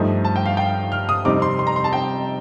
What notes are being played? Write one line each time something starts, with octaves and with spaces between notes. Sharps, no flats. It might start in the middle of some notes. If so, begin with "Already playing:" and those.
Already playing: G2 F3 A3 D#4
A5
G5
F5
G5
F6
D#6
F2 C3 G3 C4 D#4 D6
C6
C6
A#5
C6
A5
G5